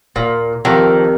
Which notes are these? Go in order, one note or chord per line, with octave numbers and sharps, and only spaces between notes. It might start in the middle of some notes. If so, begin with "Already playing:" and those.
D#1 A#2
F2 D#3 G4 A4 A#4